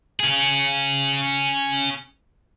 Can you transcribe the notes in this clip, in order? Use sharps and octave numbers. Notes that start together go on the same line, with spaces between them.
C#4 G#4